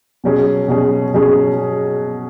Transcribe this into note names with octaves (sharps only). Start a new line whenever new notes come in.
B2 F#3 C#4 G#4
B2 F#3 C#4 G#4
B2 F#3 C#4 G#4